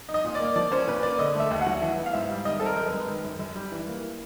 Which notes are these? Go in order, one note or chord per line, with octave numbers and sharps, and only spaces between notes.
D#4
D#5
A#2
D5
A#3
F3 D5
C#4 C5
A#2 B4
A#3 D5
D3 D#5
A3 E5
D#2
F#5
F#3
E3 E5
B3
F5
G#2 E5
G3
D#3 D#5
C4 A4
A#4
F#2
G#3 B4
D#3
F#2
F#2
G3
E3
A#3